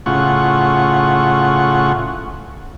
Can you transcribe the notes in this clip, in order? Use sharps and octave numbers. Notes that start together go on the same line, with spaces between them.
A2 C#3 F4 F#5 C#6